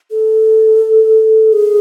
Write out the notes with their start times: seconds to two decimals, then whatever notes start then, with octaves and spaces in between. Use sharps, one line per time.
0.11 A4
1.53 G#4